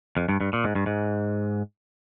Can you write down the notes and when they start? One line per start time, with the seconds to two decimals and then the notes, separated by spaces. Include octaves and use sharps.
0.17 F2
0.29 G2
0.41 G2
0.53 A#2
0.64 G#2
0.75 G2
0.86 G#2